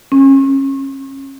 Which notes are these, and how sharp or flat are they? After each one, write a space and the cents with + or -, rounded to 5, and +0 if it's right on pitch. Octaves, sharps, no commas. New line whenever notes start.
C#4 -30